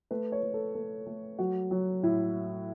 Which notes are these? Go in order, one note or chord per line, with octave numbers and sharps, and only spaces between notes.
A3 B4
C#5
A3
A4
A3 A4
A3
F#3 F#4
F#3
A2 E4